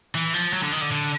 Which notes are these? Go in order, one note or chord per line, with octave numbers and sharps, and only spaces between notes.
E3
F3
F#3
D3
D#3
D3
D3